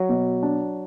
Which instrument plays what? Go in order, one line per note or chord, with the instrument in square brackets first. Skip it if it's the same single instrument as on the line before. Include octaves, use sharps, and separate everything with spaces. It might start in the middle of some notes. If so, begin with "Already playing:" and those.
Already playing: [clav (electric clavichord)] F#3
[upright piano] B2
D4